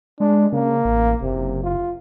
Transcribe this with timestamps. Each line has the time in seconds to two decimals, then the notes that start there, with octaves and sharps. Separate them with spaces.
0.20 G#3 D4
0.52 C#3 A#3
0.85 A1
1.22 F#1 C3
1.64 F4